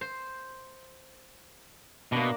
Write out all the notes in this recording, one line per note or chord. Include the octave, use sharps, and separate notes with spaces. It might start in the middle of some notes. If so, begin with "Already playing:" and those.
C5
B2 A#3 D4